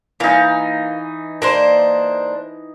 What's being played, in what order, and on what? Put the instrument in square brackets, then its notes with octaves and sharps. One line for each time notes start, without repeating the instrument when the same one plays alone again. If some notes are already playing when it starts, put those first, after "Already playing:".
[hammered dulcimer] E3 D#4 [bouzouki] A#3 F5
[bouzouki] A#3 D4 C5